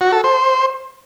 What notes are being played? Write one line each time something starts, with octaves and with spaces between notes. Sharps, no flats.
F#4
A4
C5